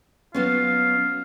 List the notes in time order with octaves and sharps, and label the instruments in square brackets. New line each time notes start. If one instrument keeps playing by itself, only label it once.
[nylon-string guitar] F#3 B3 C#4 [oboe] F4